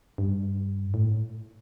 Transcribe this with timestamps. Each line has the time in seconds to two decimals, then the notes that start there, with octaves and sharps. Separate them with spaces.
0.18 G2
0.94 A2